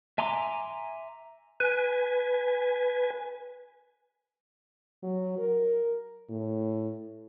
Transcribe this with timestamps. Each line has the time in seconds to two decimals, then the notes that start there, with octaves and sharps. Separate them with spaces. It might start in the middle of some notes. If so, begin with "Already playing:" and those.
0.18 E5 G#5 A#5 C6 D6
1.60 B4 G#5
5.03 F#3
5.39 A#4
6.29 A2